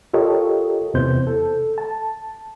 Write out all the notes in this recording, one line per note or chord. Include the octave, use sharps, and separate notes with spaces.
F4 G4 A4 A#4 C#5 D#5
E2 C3 E3 B3 C5 G6
A4
A5